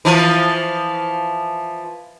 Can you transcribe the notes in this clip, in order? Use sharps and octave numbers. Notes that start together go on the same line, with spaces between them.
E3 F3